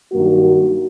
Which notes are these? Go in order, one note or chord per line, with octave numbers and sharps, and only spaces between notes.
G2 D#3 F#3 A#3 F#4